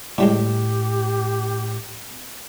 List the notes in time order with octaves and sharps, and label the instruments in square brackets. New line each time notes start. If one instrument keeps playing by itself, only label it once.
[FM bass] A2 [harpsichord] D3 G3 G#3 [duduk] G4